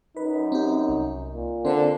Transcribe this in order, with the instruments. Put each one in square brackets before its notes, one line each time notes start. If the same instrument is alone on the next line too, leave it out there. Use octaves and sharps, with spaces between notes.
[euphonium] F#2 [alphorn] D#4 [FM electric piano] B4
[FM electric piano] C4 G4
C2
[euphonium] A#2
[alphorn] D3 [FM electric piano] C4 C5